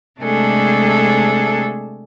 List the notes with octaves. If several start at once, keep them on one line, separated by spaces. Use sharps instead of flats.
C3 G#3 A3 D4 G#4 A4